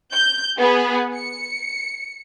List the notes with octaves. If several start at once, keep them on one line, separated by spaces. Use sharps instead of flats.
G6
B3 G#4
C#7